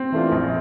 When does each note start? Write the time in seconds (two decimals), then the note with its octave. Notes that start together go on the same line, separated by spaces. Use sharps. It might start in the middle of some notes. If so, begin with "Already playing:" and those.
Already playing: C4
0.12 E3 A3 D4 F4
0.32 A#1